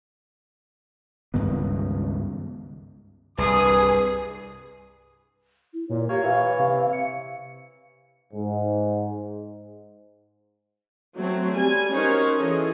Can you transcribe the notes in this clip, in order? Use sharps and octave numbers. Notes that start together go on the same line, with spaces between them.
C#2 G2 D#3 B3
C2 G2 G#4 B4 D#6
E4
A#2 C#5
A#3 G4 C#5
E3 F5
C3
C#7
G#2
F#3 A3 C4
G3 G#5
C#4 D#4 F#4 A#4 C5 C#5
E3 G#4 A4 D#5